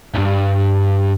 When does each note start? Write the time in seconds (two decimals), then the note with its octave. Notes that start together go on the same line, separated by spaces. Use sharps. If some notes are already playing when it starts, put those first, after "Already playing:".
0.15 B1 G2